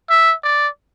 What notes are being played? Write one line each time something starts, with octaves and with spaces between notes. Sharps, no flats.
E5
D5